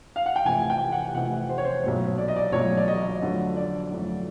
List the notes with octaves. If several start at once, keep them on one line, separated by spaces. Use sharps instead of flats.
F5
F#5
G5
F1 F2 C3 E3 A3 G#5
G5
F#5
F1 F2 C3 E3 A3 F#5
C5
C#5
C5
B1 A#2 F#3 A3 C#5
D5
D#5
D5
B1 A#2 F#3 A3 C#5
D5
D#5
F2 D3 F#3 A3
D5
F2 D3 F#3 A3